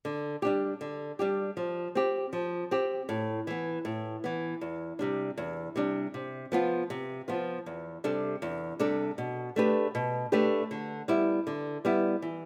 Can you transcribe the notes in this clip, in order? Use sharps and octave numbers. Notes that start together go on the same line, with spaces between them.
D3
G3 D4 G4
D3
G3 D4 G4
F3
C4 G4
F3
C4 G4
A2
E3 B3
A2
E3 B3
E2
C3 G3 D4
E2
C3 G3 D4
C3
F3 B3 F4
C3
F3 B3 F4
E2
C3 G3 D4 A4
E2
C3 G3 D4 A4
B2
A3 D4 G4 B4
B2
A3 D4 G4 B4
D3
G3 B3 E4
D3
G3 B3 E4
E3